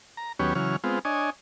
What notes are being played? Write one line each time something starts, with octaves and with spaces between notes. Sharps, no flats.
A#5
D#2 F#3 B3 C#4 G4 C#5
C#3 E3 F#3 C#5 F6
G#3 B3 C4 F4
D4 C#5 D#5 G#5